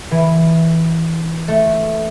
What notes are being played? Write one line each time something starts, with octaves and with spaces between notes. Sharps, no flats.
E3
A3